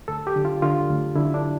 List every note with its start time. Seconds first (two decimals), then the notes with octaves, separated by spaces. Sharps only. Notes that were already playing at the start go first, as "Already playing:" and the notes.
0.08 D2 A4
0.27 G4
0.36 D3
0.45 F4
0.62 D3 F4
0.90 D2
1.16 D3 E4
1.34 D4